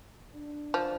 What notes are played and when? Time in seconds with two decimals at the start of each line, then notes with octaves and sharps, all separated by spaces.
0.34 D4
0.74 F3